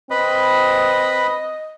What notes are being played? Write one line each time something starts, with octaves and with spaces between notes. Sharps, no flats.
C4 B4 D#5 B5